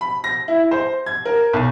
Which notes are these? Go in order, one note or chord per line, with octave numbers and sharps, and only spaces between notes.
B5
A#6
E4
C5
G#6
A#4
B1